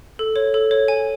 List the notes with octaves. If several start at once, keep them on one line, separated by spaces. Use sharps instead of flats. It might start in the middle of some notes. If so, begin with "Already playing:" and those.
A4
C#5
A4
C#5
G#5